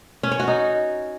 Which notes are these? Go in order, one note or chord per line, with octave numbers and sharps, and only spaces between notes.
C#4
C#5
F#4
D#4